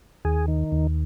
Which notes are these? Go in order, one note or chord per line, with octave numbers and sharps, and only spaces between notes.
D#2 G#4
D#3
D#2